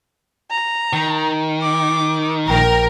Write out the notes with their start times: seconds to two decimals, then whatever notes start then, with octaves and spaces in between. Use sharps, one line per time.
0.51 A#5
0.93 D#3
1.62 D6
2.49 A#1 A#4 G5